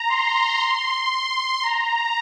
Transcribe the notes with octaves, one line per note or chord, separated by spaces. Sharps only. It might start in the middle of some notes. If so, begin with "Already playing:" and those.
Already playing: A#5
C6
C6
A#5